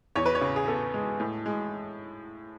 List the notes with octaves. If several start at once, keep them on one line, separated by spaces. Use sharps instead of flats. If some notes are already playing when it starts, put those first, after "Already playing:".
E2 C#5
B4
C#5
C#3
G#4
B3 A4
G#3
A2
G#3